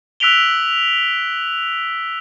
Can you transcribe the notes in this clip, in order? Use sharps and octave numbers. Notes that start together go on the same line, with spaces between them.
E6 F#6 B6 D7 F7 G7